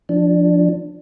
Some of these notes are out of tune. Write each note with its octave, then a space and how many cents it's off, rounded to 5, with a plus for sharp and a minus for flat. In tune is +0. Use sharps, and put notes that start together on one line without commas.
F3 +0 D4 +0